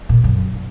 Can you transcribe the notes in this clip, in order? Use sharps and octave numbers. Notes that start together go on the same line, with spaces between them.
A#2
F#2